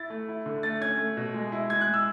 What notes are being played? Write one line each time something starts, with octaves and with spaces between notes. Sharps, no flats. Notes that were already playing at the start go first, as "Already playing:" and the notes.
Already playing: E4 A6
A3
E4
D3
A3 A6
C#4 G#6
A3
B2
G#3
E4
G#3 G#6
F#6
G#3
E6